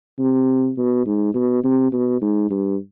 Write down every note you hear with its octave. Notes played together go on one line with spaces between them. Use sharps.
C3
B2
G#2
B2
C3
B2
G#2
G2